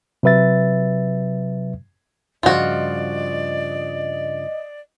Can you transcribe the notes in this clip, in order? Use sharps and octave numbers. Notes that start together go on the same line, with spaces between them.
C3 F#3 B4 E5 A6
G2 C#3 F3 F4 F#4 D5 D#5